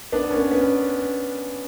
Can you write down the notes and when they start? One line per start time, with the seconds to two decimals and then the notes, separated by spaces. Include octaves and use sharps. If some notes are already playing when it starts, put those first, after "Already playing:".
0.12 B3 D4
0.31 C#4
0.37 B3
0.51 B3
0.61 C#4